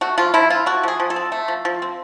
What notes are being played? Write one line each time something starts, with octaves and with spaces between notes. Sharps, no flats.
A3 F#4
F3 F4
F3 E4
C4 F4
A3 F#4
F3 G#4
F3
A4
C4
A3
F3
F3
C4